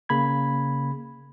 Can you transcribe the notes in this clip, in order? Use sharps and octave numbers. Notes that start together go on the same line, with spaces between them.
C#3 A#3 B5 G#6